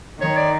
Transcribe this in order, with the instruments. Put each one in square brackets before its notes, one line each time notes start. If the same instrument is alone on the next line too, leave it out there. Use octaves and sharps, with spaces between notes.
[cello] D#3 [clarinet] C#5
[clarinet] D5